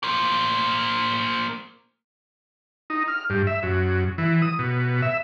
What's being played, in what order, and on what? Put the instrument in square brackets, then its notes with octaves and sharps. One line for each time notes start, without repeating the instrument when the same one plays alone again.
[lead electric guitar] A#3 C5
[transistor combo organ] D#4
F6
G2
E5
F#2
E3
D#6
B2
E5